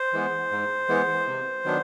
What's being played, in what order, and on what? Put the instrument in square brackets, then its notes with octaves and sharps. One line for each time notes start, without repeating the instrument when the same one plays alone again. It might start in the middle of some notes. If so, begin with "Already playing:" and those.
Already playing: [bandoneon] C5
E3 G#3 B3
G#2
E3 G#3 B3
C3
D#3 F#3 B3 D4